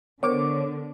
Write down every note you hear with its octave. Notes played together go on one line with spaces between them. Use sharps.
D3 B3 A#4 C5 C#5 D6